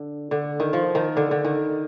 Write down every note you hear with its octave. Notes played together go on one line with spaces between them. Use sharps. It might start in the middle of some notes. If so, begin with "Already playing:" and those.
Already playing: D3
D3
D#3
F3
D#3
D3
D3
D#3